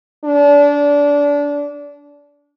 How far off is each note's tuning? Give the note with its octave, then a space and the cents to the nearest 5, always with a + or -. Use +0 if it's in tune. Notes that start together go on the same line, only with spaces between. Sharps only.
D4 -25